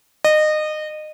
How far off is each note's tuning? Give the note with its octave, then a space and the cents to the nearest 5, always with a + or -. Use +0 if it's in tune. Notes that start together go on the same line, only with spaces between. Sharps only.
D#5 -25